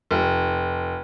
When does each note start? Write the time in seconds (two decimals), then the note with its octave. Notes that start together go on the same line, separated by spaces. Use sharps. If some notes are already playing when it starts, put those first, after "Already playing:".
0.11 F1